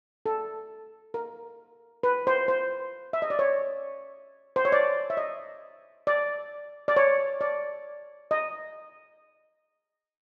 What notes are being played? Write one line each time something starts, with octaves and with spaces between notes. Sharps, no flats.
A4
A#4
B4
C5
C5
E5
D#5
D5
C#5
C5
C#5
D5
E5
D#5
D5
D5
C#5
D5
D#5